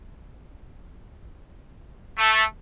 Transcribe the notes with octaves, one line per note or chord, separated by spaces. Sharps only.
A3